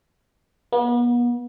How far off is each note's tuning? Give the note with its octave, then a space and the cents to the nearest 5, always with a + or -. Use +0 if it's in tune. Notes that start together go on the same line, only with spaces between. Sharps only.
B3 -40